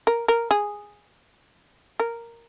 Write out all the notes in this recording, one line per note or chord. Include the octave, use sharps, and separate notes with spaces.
A#4
A#4
G#4
A#4